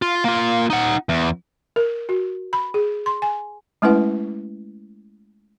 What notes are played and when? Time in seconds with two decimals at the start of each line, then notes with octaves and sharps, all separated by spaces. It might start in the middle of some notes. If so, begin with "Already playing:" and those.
0.02 F4
0.25 A#3 F4
0.70 D#4 F#5
1.09 E2
1.76 A#4
2.09 F#4
2.53 B5
2.74 G#4
3.06 C6
3.22 G#5
3.82 G#3 A3 C#4 E4 B4 F#5